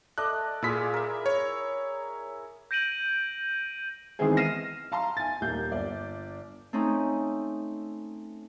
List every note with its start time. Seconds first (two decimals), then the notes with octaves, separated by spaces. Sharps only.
0.18 A3 D5 D#5 F#6
0.62 A#2 E4 F4 G#4 B6
0.94 A#4 E5
1.26 C#5
2.71 G6 A#6 D7 D#7 F#7
4.19 D#3 E3 G#3 B3 C4 G#4
4.37 F6 A#6 C7 D#7 E7
4.92 F5 A5 A#5 C6
5.17 G#5 A6
5.41 D#1 G3 A#3 G6
5.71 G1 D5
6.73 A3 C4 C#4 D#4